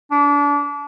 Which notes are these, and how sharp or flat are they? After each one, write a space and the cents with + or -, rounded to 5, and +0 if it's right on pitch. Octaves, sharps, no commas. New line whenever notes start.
D4 -30